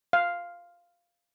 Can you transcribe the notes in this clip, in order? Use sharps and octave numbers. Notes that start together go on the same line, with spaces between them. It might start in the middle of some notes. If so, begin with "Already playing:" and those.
F5